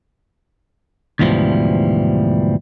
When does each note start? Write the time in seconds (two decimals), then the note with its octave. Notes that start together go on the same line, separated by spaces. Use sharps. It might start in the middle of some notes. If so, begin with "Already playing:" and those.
1.19 D2 G#2 B2 E3 F3 G3